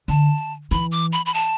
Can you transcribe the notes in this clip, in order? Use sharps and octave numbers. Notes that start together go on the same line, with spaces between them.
D3 A5
E3 B5
D6
B5
B5
A5